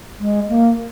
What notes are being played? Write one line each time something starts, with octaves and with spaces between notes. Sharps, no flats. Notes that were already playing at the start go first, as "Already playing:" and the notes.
G#3
A#3